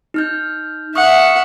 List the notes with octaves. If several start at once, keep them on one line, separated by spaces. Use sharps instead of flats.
D#4 F6 G6
E5 F#5 C#6 D#6 F6